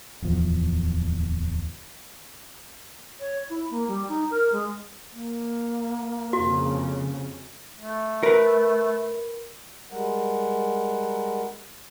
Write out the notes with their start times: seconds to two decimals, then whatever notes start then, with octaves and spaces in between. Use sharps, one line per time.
0.22 D1 E2 F3
3.20 C#5
3.50 E4
3.71 A#3
3.88 G3
4.09 D#4
4.31 A#4
4.52 G#3
5.13 A#3
6.33 F2 C#3 F#4
7.79 A3
8.23 A#4 B4
9.92 G3 G#3 A#4 F#5